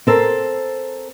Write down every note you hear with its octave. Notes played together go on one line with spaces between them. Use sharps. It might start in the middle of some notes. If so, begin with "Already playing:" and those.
C4 A4 A#4 C5